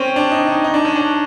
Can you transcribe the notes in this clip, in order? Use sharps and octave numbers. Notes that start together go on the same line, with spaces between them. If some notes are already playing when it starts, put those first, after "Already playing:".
Already playing: C4 C#4
D4
D#4
D#4
D#4
D4
C#4
D4